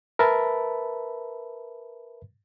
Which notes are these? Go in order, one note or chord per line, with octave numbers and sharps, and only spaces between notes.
A#4 B4 E5 A5 B5